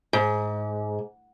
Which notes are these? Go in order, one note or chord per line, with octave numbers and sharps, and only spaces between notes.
G#2